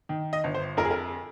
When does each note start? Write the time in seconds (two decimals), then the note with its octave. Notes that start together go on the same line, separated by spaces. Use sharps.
0.09 D#3
0.33 D#5
0.44 G1
0.54 C5
0.77 F2 A#4
0.85 G#4
0.91 A#4